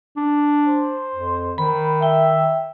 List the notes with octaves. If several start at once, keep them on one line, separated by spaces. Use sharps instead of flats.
D4
C5
F2
D#3 B5
E5 G5